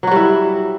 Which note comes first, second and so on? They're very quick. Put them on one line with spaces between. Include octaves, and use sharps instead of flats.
F#3 F#4 G3 E4